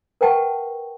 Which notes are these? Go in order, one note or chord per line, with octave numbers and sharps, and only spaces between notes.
A#4 B4 F#5 G5 A5 C#6